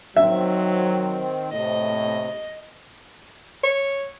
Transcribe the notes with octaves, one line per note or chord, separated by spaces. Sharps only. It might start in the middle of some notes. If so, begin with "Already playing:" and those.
D#3 F#3 C4 E5
A2 C3 D#5
C#5